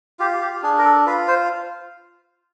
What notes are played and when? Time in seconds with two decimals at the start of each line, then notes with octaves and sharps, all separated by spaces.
0.19 F4 G4
0.41 G4
0.63 D4 G#4
0.78 A#4
0.85 A4
1.06 F4 B4
1.28 C5